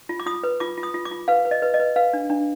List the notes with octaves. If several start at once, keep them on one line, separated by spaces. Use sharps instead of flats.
F4
D6
F4 D#6
B4
F4 D6
F4
D#6
F4
D6
F4
B4 F5
B4
D#5
B4
D#5
B4
B4 F5
D4
D4